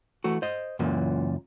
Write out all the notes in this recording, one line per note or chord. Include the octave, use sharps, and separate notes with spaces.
E3 A3 F#4
C5 D#5
C#2 F#2 A#2 E3